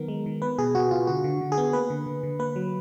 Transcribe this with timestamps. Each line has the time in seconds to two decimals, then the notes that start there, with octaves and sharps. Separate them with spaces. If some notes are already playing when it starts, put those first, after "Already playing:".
Already playing: D#3 F#3 B3 A#4
0.08 G#3
0.26 D#3
0.42 B3 B4
0.58 B2 G#4
0.75 B2 F#4
0.91 B2 F4
1.07 D3 F#4
1.24 D3
1.41 D3
1.52 G#4
1.58 B3
1.73 A#3 B4
1.90 D3
2.06 D3
2.23 D3
2.39 A#3 B4
2.56 F#3